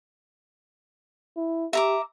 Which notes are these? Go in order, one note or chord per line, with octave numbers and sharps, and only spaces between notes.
E4
G4 E5 A#5 D6